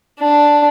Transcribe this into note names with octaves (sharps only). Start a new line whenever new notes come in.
D4